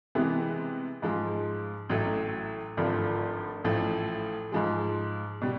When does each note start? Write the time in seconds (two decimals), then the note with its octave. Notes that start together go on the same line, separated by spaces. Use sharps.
0.15 C3 E3 G#3 B3
1.02 G#2 F3 G#3
1.89 A1 A2 F#3 A3
2.77 G#1 G2 D3 F3 A3
3.64 A1 A2 F3
4.52 G#2 F3 G#3
5.42 B2 G3